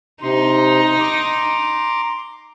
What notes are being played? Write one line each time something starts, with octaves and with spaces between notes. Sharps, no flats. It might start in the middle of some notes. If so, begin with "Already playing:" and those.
C3 D#4 C6
A#5 C6 D6